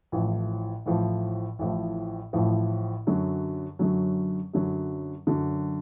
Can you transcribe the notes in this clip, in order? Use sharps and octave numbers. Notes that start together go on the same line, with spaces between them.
A1 A2 F3
A1 A2 F3
A1 A2 F3
A1 A2 F3
F#2 D3 F#3
F#2 D3 F#3
F#2 D3 F#3
F#2 D3 F#3